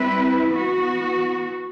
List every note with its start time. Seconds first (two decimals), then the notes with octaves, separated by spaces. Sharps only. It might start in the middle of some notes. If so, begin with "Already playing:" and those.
Already playing: G3 C4 E4 B4
0.50 E3 B3 F#4